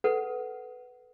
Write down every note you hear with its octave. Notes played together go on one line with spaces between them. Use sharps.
A4 B4 F#5